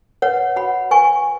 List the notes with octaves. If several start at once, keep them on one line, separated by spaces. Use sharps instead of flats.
B4 C#5 F#5
F#4 F#5 B5
B4 G#5 C#6